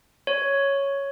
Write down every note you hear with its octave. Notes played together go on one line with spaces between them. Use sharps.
C#5